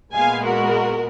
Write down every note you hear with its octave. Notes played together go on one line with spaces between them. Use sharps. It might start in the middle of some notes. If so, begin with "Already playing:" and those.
A#2 G#3 B3 F5 G#5
F#4 A#4